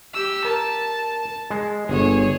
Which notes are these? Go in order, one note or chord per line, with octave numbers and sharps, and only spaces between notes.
G4 E6
A#4 A5
G#3
G1 G#4 C#5